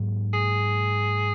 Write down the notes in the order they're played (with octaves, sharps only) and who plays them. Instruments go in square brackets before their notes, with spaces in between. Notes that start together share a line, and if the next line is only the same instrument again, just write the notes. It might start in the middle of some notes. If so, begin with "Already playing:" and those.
Already playing: [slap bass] G#2 F#3 A#3
[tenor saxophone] G#4